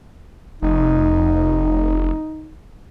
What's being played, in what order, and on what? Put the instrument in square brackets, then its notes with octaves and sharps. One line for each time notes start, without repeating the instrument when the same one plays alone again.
[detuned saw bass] F1 [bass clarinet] D#4